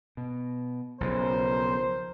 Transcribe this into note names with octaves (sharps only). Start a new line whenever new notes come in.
B2
B1 C#3 F3 A#4 C5